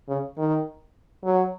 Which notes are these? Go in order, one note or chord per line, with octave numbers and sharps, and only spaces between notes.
C#3
D#3
F#3